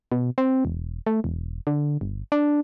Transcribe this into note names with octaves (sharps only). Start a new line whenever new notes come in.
B2
C4
E1
A3
E1
D3
G1
D4